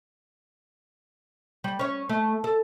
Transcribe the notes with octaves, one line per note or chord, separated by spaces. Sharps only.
G3
C#4 C#5
A3
A4